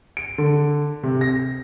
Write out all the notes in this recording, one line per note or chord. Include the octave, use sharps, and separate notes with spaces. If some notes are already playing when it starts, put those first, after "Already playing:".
D7
D3
C3
A#6